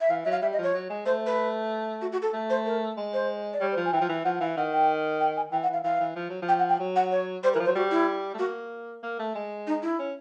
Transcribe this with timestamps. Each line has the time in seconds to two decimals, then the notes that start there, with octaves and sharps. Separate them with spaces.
0.01 E5
0.10 E3 F5
0.25 F#3 E5
0.32 F5
0.42 G3 E5
0.53 D#5
0.59 F3 C#5
0.74 F#3
0.90 G#3
1.06 A3 C5
1.27 B4
2.02 F#4
2.12 F#4
2.22 A4
2.33 A3
2.50 C5
2.66 A#4
2.97 G#3
3.13 C5
3.53 D5
3.60 G3 C#5
3.72 C5
3.77 F3
3.85 G#5
3.93 E3 G5
4.01 F3
4.09 E3
4.25 F3 F#5
4.41 E3 F5
4.57 D#3 F#5
4.73 G5
5.20 G5
5.37 G#5
5.52 E3 G5
5.63 F#5
5.68 E3 F5
5.84 E3 F5
6.00 E3
6.16 F3
6.30 F#3
6.42 F3
6.48 G5
6.59 F#5
6.69 G5
6.80 F#3
6.96 F#5
7.11 C#5
7.44 G3 C5
7.54 E3 A#4
7.60 F3
7.65 C5
7.68 F#3
7.75 G3 F#4
7.91 E4
8.34 A3
8.39 A#3 F#4
9.03 A#3
9.19 A3
9.35 G#3
9.67 D#4
9.82 E4
9.99 C#4